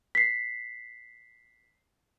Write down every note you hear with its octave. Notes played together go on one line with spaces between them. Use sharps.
B6 C7